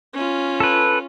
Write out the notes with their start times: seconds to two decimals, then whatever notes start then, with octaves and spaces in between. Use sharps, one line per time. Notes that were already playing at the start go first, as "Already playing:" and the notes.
0.14 C#4 F4
0.60 A4 B4